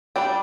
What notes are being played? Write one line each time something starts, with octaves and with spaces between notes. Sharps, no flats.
G3 D4 G5